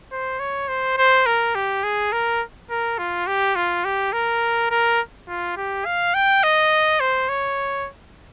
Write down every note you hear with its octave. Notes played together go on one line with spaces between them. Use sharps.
C5
C#5
C5
C5
A#4
G4
G#4
A#4
A#4
F4
G4
F4
G4
A#4
A#4
F4
G4
F5
G5
D#5
C5
C#5